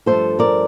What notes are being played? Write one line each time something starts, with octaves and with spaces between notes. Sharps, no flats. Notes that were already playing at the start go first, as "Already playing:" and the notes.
G2 F3 A3 A4 C5
A#4 D5